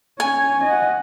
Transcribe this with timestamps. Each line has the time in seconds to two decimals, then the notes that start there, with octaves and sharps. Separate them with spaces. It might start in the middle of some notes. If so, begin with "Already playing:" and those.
0.20 C#4 C#5 G#5
0.63 D#5 F#5